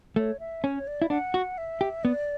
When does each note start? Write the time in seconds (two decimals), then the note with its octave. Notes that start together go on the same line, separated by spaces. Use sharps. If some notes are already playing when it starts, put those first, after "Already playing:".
0.16 A3 C#5
0.40 E5
0.64 C#4 C#5
0.87 D5
1.02 E4
1.10 D4 F#5
1.34 F#4
1.58 E5
1.81 G4
2.04 B3 D5